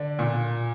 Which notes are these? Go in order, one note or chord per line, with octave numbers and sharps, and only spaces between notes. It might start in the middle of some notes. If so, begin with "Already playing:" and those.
Already playing: D3 D4
A#2